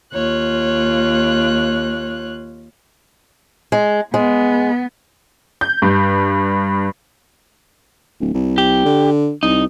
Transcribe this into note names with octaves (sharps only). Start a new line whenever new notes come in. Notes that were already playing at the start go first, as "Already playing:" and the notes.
D#2 F4 C#5 F#6
G#3
G#3 B3
G6
G2
D1
C2
G4
D3
C2 D#4